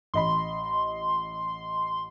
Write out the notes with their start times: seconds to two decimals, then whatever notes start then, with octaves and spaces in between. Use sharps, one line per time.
0.14 A1 D#5 B5 C6